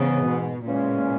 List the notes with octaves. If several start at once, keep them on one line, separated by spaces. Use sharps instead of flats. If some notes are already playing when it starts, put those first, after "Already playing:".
Already playing: G#2 C#3 E3 B3
B2
E2 A#2 C#3 G#3 C#4